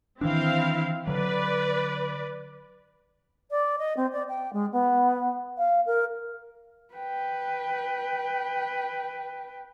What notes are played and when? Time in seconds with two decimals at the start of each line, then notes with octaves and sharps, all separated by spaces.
0.21 D#3 E3 C4 D4 E4 F5
1.07 D3 F#3 B4 D5
3.50 D5
3.78 D#5
3.96 C4
4.12 D5
4.28 G5
4.53 G#3
4.72 B3
5.58 F5
5.86 A#4
6.94 B4 G5